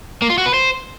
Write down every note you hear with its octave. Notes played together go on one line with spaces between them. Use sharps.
A#3
F4
F#4
B4
C5